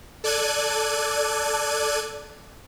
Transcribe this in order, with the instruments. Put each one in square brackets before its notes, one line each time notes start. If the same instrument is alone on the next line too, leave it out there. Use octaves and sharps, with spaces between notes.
[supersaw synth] A4 D5 F#6 G#6 D#7